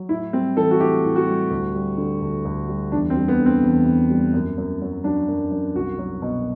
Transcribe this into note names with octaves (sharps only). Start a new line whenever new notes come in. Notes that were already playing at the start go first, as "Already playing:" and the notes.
Already playing: F#3
A2 E4
G3 C4
E3 A4
F#4
A2 G4
A2
F#4
G3
D2
G3
D3
D2
D2
G3
E2 D4
C4
G3
B3
D3
C4
E2
E2
G3
F#2
F#2
F#3
F#3 D4
F#2
F#2
C2 F#4
F#3
B2